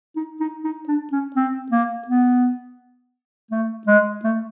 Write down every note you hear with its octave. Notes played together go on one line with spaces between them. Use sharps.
D#4
D#4
D#4
D4
C#4
C4
A#3
B3
A3
G#3
A3